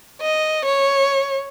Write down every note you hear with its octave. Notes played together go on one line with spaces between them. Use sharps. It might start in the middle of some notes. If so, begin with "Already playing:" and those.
D#5
C#5